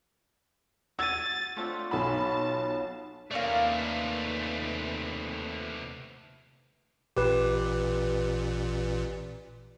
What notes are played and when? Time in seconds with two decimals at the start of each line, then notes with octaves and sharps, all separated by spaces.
0.99 F#4 E6 G#6 A6 D#7
1.57 A3 C4 D4 F4
1.91 B1 B3 C#4 B4 A5 B5
3.31 D#2 C3 A3 A#3 C#4 D4 B4
7.16 A1 A#2 G4 B4